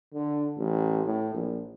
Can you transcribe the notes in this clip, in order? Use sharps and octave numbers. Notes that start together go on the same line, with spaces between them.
D3
A1
A2
A#1